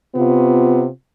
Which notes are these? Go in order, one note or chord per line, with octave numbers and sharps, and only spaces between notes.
C3 B3 F4